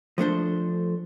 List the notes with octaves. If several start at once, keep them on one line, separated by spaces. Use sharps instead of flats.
F3 A3 D4 A4 C5